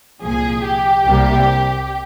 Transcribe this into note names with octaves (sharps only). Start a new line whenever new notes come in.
C2 A#2 F3 G#4
G4
C2 C3 G3 A#3